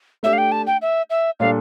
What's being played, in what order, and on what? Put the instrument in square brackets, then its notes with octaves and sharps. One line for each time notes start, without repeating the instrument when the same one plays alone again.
[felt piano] A3 D4 G4 [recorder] E5
[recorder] F5
G5
A5
G5
E5
E5
[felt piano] A#2 G3 D4 A4 D5 [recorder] F5